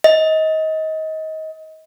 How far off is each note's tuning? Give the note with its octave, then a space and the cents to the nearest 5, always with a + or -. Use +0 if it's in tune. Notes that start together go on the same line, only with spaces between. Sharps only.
D#5 +25